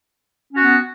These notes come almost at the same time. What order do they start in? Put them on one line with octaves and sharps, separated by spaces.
C#4 F#4 B3